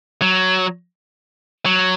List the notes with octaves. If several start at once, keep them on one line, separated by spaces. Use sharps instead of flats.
F#3
F#3